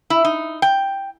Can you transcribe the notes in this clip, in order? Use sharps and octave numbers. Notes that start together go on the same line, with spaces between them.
E4
D#4
G5